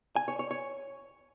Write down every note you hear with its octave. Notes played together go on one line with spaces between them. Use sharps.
G#5
C#5
C#5
C#5